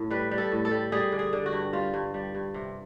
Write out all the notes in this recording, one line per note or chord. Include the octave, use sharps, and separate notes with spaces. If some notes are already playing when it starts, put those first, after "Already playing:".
Already playing: A2
G3 B4
G3
A4
A2
A4
G3
G3 G#4
D3
G#4
D3
F#4
G2
G3 F4
G2
G3
G2
C3